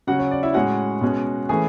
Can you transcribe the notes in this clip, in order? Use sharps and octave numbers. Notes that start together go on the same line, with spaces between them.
C#3 F#3 C#4 F#4 F#5
C#5
D5
E4 E5
A2 G#3 C#4 F#4 F#5
B2 G#3 C#4
E3 A3 C#4 G#4 G#5